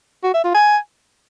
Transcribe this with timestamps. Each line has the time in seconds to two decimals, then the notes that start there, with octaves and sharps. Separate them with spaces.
0.24 F#4
0.34 E5
0.44 F4
0.55 G#5